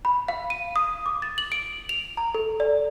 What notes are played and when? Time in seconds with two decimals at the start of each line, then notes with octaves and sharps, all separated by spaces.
0.05 B5
0.28 F5
0.50 D#7
0.76 D#6
1.06 D6
1.22 A6
1.38 F#7
1.52 D7
1.89 F7
2.17 A#5
2.35 A4
2.60 D5